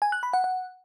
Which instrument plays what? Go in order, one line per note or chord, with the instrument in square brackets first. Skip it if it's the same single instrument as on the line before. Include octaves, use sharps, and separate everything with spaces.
[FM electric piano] G#5
F#6
B5
F#5
F#5